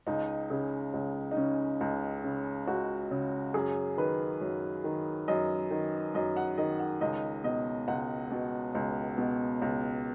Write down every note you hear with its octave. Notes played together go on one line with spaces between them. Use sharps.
C#2 D#4
C#3 G#4
C#2
D#4
C#3 C#4
C#2
C#3
C#2 F#4
C#3
F#2 G#4
D#3 B4
F#2
D#3
F#2 D#5
D#3
F#2 D#5
F#5
D#3 D#5
F#5
C#2 D#5
B2 D#5
C#2 F#5
B2
C#2
B2
C#2